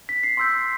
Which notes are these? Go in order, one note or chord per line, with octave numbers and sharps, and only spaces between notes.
B6
C7
C6 E6 G6